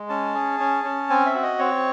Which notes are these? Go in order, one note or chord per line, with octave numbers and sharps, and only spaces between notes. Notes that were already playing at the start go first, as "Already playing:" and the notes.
Already playing: G#3
C#4 A5
G#4
C#4
C#4
C4 G#5
E5
F#4
D#5
C4 C#5